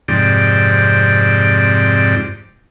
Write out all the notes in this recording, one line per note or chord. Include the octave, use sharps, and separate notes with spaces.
F2 G#2 C3 D5 G5